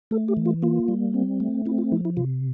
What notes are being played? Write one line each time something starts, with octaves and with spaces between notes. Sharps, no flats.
A3 A4
G4
E3
F4
A#3 F4
G3
C4
A3
C4 E4
F4
F3 E4
E4
C3 F4